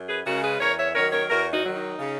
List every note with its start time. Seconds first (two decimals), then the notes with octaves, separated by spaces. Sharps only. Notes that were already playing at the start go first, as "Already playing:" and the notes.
Already playing: F#2
0.09 G#4 B4
0.26 C#3 G#3 C#4 F#4 A#4
0.43 G#4 B4
0.60 E2 A#4 C#5
0.78 C#5 E5
0.94 D#3 F#3 A#4 C#5
1.12 A#4 C#5
1.30 E2 F#4 A#4
1.52 D#4 F#4
1.64 D#3 F#3
1.76 D#4
1.99 C#3